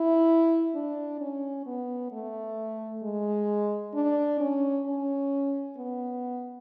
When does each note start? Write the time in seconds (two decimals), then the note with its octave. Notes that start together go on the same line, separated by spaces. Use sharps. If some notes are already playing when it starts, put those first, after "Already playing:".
Already playing: E4
0.75 D4
1.20 C#4
1.66 B3
2.12 A3
3.03 G#3
3.94 D4
4.40 C#4
4.86 C#4
5.77 B3